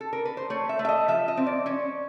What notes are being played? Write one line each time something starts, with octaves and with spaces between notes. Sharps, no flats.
A4
A#4
B4
C5
A3 C#5
E5
A3
E5
D#5
F3 E5
D#5
C4
D5
C#4 C#5